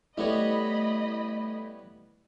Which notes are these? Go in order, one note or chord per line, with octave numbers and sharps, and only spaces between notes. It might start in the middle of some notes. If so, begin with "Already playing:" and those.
G3 A3 B3 E4 C#5 D#5 B5